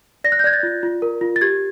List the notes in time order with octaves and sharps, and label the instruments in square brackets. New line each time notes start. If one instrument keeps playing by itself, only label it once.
[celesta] D5 A#6
F#6
G6
D5 G#6
A6
F4
F4
A#4
F4
A6
G4 G#6